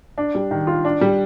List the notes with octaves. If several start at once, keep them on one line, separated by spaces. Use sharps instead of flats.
D4
G3
D#3
F4
D4
G3